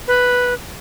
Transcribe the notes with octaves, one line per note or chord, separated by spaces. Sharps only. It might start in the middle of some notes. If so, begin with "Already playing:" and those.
B4